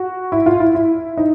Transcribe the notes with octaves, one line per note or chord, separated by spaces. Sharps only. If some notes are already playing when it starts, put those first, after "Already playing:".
Already playing: F#4
E4
F4
E4
E4
D#4